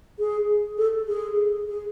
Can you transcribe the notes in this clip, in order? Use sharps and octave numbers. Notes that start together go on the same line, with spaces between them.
G#4
A4
G#4
G#4